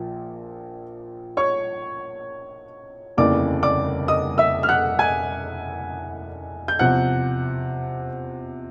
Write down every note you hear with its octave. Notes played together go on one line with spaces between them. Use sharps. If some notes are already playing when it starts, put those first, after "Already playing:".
Already playing: A#1 A#2 F3
C#5 C#6
F1 D#2 C#3 E3 D5 D6
D5 D6
D#5 D#6
E5 E6
F6
F#5 F#6
G#5 G#6
G6
E2 C3 F3 F#5 F#6